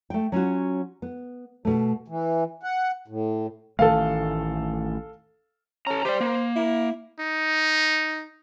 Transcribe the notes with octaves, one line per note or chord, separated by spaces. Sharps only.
A3 G5
F#3 C#4 F4 F#4
B3
B2 A3
E3
F#5
A2
A1 D#3 A3 A4 F5
C#4 A4 A#5
G4 C5 D5
A#3
E4
D#4